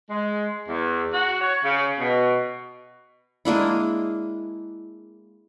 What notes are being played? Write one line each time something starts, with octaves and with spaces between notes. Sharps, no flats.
G#3
E2
F#4
C#5
C#3
B2
G#3 A#3 D4 E4